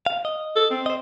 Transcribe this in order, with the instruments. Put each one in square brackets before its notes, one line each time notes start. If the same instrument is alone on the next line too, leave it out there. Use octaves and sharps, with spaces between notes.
[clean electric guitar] F5
D#5
[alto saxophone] A4
C4
[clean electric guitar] C5 D#5